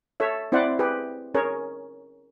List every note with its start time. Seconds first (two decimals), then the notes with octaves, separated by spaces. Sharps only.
0.20 A4 C#5 E5
0.52 C4 E4 C5 D5 F#5
0.79 G4 G#4 B4
1.34 C#4 G#4 A#4 C#5